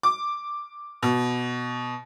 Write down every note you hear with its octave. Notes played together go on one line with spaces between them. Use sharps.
D6
B2